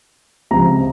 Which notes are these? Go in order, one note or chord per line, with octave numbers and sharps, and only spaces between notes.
C#2 C3 F3 A#5